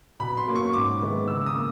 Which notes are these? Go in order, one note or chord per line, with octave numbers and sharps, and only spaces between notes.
B2 B5
C6
F#3 A#3 C#4
C#6
G#2 D6
D#3 G#3 B3 E4
C#3 E6
D#6
A#3